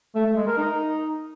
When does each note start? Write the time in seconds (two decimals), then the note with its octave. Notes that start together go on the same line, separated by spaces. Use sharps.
0.15 A3
0.26 A3
0.36 G#3
0.47 A#4
0.58 D#4